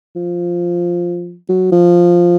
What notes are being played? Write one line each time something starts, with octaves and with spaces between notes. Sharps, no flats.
F3
F#3
F3